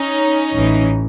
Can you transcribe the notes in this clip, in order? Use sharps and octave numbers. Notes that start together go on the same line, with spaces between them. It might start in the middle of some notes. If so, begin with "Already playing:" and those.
Already playing: C#4 D#4
A1 A2 E3